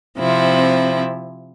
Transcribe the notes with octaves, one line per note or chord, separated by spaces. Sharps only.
C3 F3 C4 E4